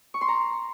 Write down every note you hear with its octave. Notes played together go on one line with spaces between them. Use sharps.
C#6
C6
A#5